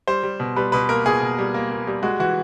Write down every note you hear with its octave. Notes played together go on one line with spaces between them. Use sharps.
G3 C5
G3
B2
G3 B4
B2 B4
A#3 A#4
B2 G#4
B2
G3
A#3
A#3
G3
G#3 F#4
E3 F#4